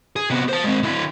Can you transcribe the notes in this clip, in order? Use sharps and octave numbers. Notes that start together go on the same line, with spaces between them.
G#4
C3 B3
C5 A5
G#3 C4
D3 E4